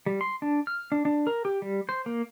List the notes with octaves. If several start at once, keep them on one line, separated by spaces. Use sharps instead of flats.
G3
C6
D4
F6
D4
D4
A#4
G4
G3
C5
A#3